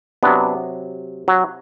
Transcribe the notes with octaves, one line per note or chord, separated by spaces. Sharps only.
C3 F#3 B3 D4
F#3